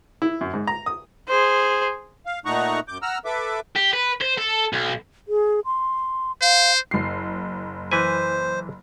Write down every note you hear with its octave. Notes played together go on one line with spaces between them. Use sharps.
E4
F#2
G#2
A#5
D#6
G#4 C5
F5
A#2 A3 D#4 F#5 A#5 C#6
F#2 D6 G6
F#5 A#5 E6 F6
A4 B4 E5 D6
G4
B4
C5
A4
B1
G#4
C6
C5 F5
F#1 C7
E3 B4 C5 G#5